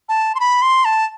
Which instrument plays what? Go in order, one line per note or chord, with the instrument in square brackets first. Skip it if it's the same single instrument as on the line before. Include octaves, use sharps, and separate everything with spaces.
[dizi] A5
C6
B5
C6
A5